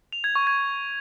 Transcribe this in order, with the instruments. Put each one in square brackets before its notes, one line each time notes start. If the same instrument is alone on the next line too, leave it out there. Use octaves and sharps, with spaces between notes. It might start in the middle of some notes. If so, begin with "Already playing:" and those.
[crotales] F7
G#6
C#6
G#6